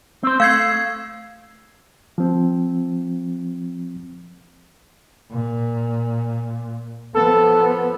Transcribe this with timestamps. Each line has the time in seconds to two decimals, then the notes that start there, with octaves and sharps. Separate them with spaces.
0.23 C4 C5
0.40 A3 F5 G#6 C7
2.18 F3 C4
5.31 A#2
7.14 F3 B3 A4